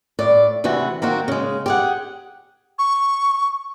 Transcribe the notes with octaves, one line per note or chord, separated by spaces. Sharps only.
A2 D5
D2 C3 E3 F#4
D#3 A#3 C4 F#4
C#3 G#3
G4 G#4 F#5
C#6